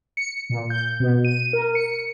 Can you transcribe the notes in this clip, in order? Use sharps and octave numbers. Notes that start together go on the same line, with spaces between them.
C#7
A#2
G6
B2
D#7
A#4
C#7